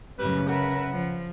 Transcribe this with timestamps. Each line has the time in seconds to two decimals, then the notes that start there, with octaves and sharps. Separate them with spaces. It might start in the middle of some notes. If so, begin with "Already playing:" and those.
0.19 F#2 A2 C#3 G3 B4
0.49 A#4 B4 E5 F#5
0.91 F3